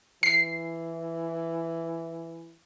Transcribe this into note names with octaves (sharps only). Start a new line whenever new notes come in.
E3 C7